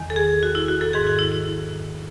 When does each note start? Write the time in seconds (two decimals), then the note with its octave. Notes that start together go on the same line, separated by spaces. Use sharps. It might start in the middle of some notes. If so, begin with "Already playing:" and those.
Already playing: E2 D#3
0.10 A4
0.16 G#4
0.43 F#4
0.55 E4
0.68 F#4
0.81 A4
0.93 G#2 D#3 G#4
1.07 F#4
1.19 E4
1.32 E4